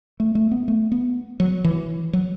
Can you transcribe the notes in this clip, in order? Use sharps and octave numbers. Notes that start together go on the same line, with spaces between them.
A3
A3
B3
A3
B3
F#3
E3
F#3